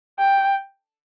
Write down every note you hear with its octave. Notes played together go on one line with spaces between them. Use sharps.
G5